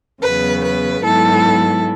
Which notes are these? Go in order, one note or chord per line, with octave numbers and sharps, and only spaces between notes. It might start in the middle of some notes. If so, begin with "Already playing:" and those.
E2 C#3 F#3 B3 B4
B4
G#2 F#3 B3 E4 A4